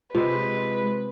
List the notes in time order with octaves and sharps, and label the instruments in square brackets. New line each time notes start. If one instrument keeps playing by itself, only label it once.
[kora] C3 C5 [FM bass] G#3 [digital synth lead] F4 [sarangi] B4